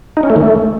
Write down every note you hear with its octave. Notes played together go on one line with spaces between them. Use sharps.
D#4
C#4
A3
D#3
A3